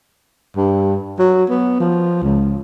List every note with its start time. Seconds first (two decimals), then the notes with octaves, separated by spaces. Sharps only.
0.57 G2
1.19 F#3
1.50 B3
1.80 F3
2.23 C#2